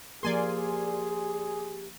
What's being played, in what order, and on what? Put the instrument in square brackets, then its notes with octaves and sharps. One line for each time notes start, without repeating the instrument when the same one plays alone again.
[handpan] F3 A#3 A#4 [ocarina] G4 [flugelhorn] G#4 [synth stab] D5 G#5 C6